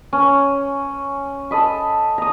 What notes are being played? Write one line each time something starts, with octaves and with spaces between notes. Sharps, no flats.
C#4
A4 D#5 B5
A#5 D#6